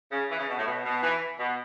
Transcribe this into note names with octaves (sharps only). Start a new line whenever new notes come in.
C#3
E3
C#3
B2
A2
B2
B2
E3
B2